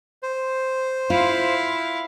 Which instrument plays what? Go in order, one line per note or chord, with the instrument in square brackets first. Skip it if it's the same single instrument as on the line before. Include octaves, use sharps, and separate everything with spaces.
[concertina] C5
[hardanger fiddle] E4 F5 [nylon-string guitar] F4